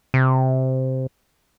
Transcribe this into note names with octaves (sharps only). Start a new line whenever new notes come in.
C3